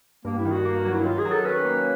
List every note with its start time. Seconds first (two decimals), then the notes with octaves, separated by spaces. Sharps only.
0.25 G2 A#3
0.38 E4
0.45 D#3
0.51 F#4
0.65 A#3
0.85 F#3
0.93 E4
1.05 D#3 F4
1.19 G#4
1.25 F#3
1.32 A4
1.45 C#4 B4
1.65 A#3